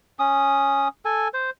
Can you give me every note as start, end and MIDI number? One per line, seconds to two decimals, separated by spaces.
0.19 0.88 61
0.19 0.88 87
1.05 1.28 69
1.05 1.28 80
1.34 1.50 72